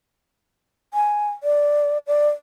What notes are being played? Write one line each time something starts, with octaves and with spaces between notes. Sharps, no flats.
G#5
D5
D5